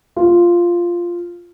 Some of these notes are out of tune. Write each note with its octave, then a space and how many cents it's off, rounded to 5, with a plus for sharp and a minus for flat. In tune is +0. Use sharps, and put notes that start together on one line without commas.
F4 -5